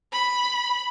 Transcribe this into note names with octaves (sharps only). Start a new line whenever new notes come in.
B5